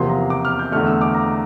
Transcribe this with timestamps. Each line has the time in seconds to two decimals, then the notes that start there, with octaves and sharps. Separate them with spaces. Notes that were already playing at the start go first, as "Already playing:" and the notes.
Already playing: E2 C3 F3 A#3 C6
0.09 A#5
0.30 D6
0.45 F6
0.59 G6
0.72 E2 D3 A3 F6
0.87 E6
1.01 D6
1.14 A#5